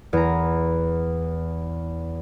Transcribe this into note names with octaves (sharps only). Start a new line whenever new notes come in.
E2 A#5